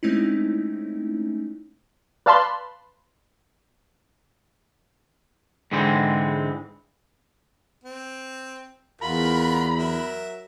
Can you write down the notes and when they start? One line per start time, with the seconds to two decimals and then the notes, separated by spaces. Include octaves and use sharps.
0.03 G#3 A3 C4 C#4 D#4 E4
2.26 B4 D5 F5 A5 B5 C6
5.72 G#2 D3 E3 G#3 C4
7.84 C4
9.01 E2 F4 F#4 A#4 B5
9.78 F#3 A#4 E5